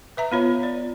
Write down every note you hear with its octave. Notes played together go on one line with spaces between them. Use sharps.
B4 E5 A#5
B3 F4 C#5
D5